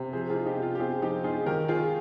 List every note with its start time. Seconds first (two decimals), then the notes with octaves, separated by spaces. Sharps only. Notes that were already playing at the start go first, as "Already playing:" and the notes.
Already playing: C3
0.13 F3 G#4 C5
0.30 F4 G#4
0.34 D#4
0.46 D#4 G4
0.57 C3
0.62 F4
0.75 G4
0.80 C4 F4 G#4
1.02 F3 D#4 G4
1.24 D#4 F4 G#4
1.46 D#3 G4 A#4
1.68 D#4 F4 G#4